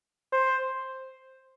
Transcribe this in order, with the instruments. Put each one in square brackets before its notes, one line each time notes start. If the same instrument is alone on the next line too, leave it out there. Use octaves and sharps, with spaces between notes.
[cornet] C5